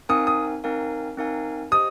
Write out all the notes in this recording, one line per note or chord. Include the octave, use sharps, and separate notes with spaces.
C4 D#4 A#4 F5 G#5 D#6
D#6
C4 D#4 A#4 F5 G#5
C4 D#4 A#4 F5 G#5
G4 C5 D#5 D#6